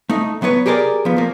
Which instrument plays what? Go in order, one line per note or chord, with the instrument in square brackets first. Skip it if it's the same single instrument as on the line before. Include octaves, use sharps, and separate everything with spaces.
[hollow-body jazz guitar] A3 D#4
F#3 B3 B4 C#5
G4 G#4 A#4 B4 D5
F3 B3
F3 A#3